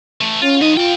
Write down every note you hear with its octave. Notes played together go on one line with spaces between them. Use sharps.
E3 A3
C#4 F4
F3 D#4 D#5
F4 A4 G5